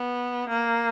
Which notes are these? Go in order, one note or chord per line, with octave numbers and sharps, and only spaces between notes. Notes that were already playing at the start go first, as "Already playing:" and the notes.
Already playing: B3
A#3